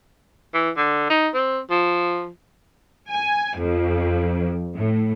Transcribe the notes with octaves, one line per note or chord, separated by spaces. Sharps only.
E3
D3
D#4
C4
F3
G#5
F2
A2